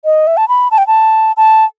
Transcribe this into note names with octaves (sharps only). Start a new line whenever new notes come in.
D#5
E5
A5
B5
A5
G5
A5
A5